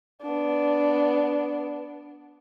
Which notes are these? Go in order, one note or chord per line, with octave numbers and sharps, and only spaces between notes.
B3 D4